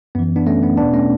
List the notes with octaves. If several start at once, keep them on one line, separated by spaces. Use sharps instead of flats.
F#2 E3 B3
B3 D4
A3 C#4
B3
E2 B2 B3 D4
A3 C#4